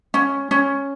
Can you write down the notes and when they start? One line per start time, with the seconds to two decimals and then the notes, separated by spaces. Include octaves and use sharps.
0.14 C#4
0.51 C#4